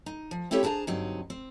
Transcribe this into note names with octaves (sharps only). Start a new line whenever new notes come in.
D#4
F3
C4 E4 F4 G4 A4 C#5
D4 E4 G#4 C5 A5 A#5
G2 D3 F#3 C4 D#4
C4